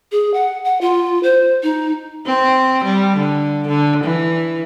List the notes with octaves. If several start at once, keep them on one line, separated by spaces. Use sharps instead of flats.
G#4
F#5
F#5
F4
C5
D#4
C4
G3
D3
D3
E3